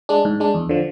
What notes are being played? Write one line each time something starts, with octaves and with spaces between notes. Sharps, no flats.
G#3 D4
G#2
G#3 D4
E2
D3 F3